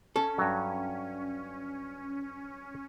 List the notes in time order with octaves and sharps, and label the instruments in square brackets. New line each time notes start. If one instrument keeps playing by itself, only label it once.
[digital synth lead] C#4 [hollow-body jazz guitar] A4
[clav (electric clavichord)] G2 F#3